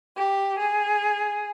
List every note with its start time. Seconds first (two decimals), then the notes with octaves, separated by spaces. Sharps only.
0.16 G4
0.58 G#4